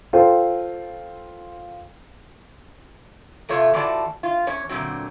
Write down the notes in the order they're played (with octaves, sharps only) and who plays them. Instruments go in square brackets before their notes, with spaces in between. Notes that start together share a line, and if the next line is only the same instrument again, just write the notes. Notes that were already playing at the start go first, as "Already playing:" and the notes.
[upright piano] F4 A4 C5 G5
[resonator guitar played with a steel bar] E2 C3 A3 F4 C#5
A2 E3 F4 F#4 D5 A5
F4
E2 C#4 C#5
A#2 D3 D#3 F#3 C4